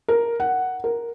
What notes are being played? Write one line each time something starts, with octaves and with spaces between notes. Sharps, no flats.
A#4
F#5
A#4